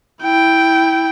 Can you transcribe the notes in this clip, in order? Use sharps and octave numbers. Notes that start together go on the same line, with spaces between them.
E4 G5